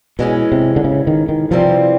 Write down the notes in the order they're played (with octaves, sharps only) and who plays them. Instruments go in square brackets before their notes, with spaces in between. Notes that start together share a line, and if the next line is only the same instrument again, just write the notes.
[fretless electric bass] B2 [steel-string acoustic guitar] E3 G#3 C#4
[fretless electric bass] C3
D3
C#3
D#3
D#3
[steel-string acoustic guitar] C3 E3 G3 C4 [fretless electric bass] F3